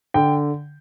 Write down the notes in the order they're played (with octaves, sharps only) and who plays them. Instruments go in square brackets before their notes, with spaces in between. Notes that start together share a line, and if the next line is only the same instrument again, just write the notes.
[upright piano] D3 G5